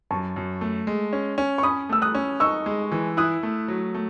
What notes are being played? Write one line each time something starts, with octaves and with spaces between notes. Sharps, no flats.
F#2 A5 C#6
F#2
A3
G#3
C#4
C#4
C#6
C#4 B5 D#6
A3 E6
D#6 F#6
C#4
D#4 C#6 E6
G#3
E3
E4 D#6 F#6
A3
F#3
A3